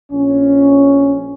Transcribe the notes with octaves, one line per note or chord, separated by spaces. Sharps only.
A#1 C#4